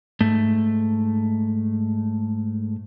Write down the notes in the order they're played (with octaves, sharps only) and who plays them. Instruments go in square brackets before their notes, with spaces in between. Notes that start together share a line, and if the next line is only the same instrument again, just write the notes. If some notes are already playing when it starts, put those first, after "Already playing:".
[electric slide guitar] G#2 A3